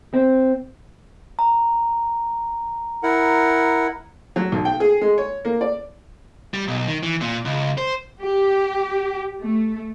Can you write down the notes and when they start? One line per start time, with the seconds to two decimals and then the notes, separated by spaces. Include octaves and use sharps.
0.14 C4
1.39 A#5
3.03 E4 A#4 F#5
4.36 F#3
4.52 B1
4.65 G5
4.80 G#4
5.01 G#3
5.18 C#5
5.45 A#3
5.61 D5
6.54 G3
6.68 B1
6.87 D#3
7.03 E3
7.21 A#2
7.45 C#2
7.78 C5
8.22 G4
9.41 A3